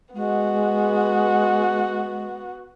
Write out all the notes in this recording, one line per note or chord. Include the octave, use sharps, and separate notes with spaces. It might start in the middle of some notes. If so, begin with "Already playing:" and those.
G#3 B3 F#4